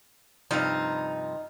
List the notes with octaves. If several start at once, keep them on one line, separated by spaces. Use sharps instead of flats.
G2 C3 F3 D#4